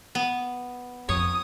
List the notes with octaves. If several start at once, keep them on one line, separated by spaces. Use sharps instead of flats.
B3
F2 C#5 D#6